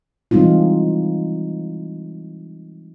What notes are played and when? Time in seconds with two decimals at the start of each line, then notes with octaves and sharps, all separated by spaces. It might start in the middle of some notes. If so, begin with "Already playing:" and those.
0.31 E3 G3 G#3 C4 D#4 F4